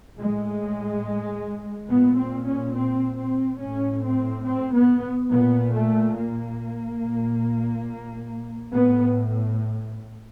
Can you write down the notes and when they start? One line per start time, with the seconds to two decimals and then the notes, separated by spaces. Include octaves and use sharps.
0.18 A2 G#3
1.88 A#2 B3
2.17 C4
2.45 C#4
2.74 C4
3.17 C4
3.59 A2 C#4
4.03 C4
4.45 C4
4.73 B3
5.30 A#2 B3
5.73 A3
6.16 A#3
7.01 A#2
8.72 A2 B3